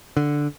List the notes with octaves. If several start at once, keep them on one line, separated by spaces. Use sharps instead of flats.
D3